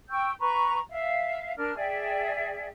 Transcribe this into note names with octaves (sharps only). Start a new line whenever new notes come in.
G5 C#6 E6 G6
B4 A#5 C#6
E5 F5
D4 A#4 F6
G#4 D5 E5 G5